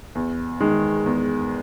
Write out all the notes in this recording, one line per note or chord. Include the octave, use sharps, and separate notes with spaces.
E2
D#3 G#3
E2